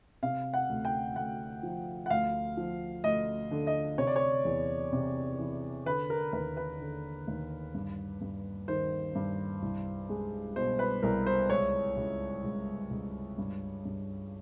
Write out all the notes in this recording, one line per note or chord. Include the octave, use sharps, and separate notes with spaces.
C3 F5
F#5
D2
G5
D2 F#5
F3
F#5
D2 F5
F3
D2 D#5
D3
D#5
C3 C#5
D5
C#5
E2
C3
E3
D3 B4
A#4
D#2 B4
B4
D3
D#2
G2
G2
D#3 C5
G2
C2
G#3
B2 C5
B4
C2 A#4
C5
C#2 C#5
C#2
C#2
C#2
G2
G2